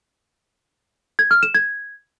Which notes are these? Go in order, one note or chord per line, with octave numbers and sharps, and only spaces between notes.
G#6
F6
E7
G#6